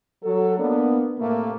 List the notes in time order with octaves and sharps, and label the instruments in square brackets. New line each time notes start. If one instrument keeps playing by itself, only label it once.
[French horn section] F#3 A4
A#3 B3 D4
A2 C3 A3 A#3